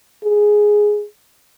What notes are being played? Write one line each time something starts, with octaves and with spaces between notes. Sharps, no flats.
G#4